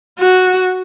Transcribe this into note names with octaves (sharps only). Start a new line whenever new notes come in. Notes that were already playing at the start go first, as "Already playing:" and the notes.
F#4